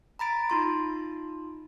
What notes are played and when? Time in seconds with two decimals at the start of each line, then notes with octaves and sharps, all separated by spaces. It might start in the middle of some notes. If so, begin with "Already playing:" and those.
0.19 A#5 B5 A6 D7
0.50 D#4 F4 C6